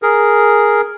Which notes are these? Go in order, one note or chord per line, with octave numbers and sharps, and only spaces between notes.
G#4 A#4